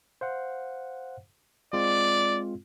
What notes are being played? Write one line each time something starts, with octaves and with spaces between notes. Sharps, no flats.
C5 F5 F#5
G#3 C4 F4 D5